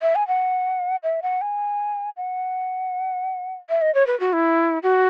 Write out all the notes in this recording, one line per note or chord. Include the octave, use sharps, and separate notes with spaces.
E5
G#5
F#5
E5
F#5
G#5
F#5
E5
D#5
C#5
B4
F#4
E4
F#4